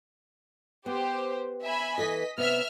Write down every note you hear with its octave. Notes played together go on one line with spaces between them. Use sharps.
B3 G4 C5
E5 G#5 B5
E3 A4 B4 D#5 B6
C3 B3 E5 F6